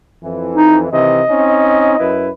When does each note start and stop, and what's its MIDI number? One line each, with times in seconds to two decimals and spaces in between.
0.23 0.92 41
0.23 0.92 52
0.56 0.78 63
0.92 1.21 48
0.92 1.21 51
0.92 1.21 52
0.92 2.34 75
1.29 1.98 60
1.29 1.98 61
1.29 1.98 63
1.99 2.29 42
1.99 2.29 64
1.99 2.29 71